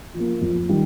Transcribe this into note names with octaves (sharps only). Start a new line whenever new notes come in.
F3
A#3
F2
D#3 G3